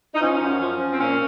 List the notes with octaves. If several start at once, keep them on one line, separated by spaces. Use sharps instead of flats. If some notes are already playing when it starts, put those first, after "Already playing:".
D#4
F3 C#4
F#2
F3
F3
C4
A#2 C#4